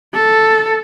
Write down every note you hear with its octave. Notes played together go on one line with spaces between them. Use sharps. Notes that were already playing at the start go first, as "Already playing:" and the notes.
A4